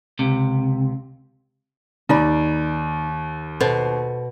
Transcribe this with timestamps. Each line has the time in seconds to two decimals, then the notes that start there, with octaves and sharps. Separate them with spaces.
0.19 C#2 C3
2.09 D#2 D#4 D5 B5
3.61 B2 A4 C5